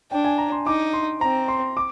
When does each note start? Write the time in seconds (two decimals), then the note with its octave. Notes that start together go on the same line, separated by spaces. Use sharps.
0.11 D4 G5
0.25 G#5
0.38 A#5
0.52 C6
0.66 D#4 D6
0.93 C6
1.21 C4 A#5
1.48 C6
1.77 D6